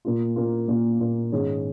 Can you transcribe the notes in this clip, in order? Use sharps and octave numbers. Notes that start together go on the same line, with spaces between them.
A#2 A#3 F4
A#2 A#3 F4
A#2 A#3 F4
A#2 A#3 F4
G#2 D#3 C#4 G#4 C#5